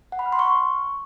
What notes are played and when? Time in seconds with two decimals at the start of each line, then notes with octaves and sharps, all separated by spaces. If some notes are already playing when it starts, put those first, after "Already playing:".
0.12 F#5
0.19 B5
0.26 F6
0.32 C6
0.39 C#6